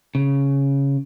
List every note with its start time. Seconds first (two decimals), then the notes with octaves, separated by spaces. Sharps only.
0.15 C#3